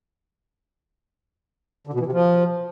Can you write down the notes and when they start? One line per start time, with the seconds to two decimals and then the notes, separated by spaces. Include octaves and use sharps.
1.87 D3
1.93 B2
2.00 E3
2.06 C3
2.12 F3